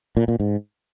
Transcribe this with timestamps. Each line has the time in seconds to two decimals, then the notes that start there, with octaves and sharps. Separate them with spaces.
0.17 A#2
0.28 A#2
0.40 G#2